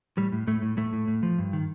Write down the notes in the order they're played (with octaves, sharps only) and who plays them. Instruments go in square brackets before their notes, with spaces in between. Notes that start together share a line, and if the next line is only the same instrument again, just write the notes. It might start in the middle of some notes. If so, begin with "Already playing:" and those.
[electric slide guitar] A2 G3
A2
A2 A3
A2
A2 A3
A2
A2
F3
G2
D#3